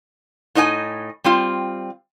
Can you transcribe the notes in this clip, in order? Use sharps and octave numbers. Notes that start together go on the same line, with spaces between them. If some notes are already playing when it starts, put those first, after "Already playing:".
A2 D#4 D#5 E5 G#5
G3 C4 F4